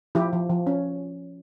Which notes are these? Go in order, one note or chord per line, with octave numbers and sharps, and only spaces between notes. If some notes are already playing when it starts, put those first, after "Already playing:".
F3 E4 G4
F3
F3
C#4